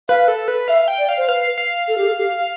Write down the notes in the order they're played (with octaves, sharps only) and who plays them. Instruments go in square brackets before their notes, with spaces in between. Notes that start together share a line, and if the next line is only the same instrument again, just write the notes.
[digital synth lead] B4 [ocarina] F5
[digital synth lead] A4
B4
[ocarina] E5 [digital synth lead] F5
[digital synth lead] G5
[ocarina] D5
[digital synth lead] F5
[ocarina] C5
[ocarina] B4 [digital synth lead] F5
[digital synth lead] F5
[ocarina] A4
G4
A4
G4